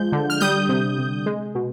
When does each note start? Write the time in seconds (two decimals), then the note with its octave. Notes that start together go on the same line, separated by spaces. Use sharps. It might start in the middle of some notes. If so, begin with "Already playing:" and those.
Already playing: F3 G#3 G6
0.12 D3
0.30 F6
0.40 G3 D#6 G6
0.69 C3
0.98 C3
1.26 G#3
1.55 B2